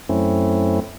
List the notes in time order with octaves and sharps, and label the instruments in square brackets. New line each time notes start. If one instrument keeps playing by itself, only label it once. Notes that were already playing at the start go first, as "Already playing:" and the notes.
[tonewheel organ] F#2 A3 C4 C#4 E4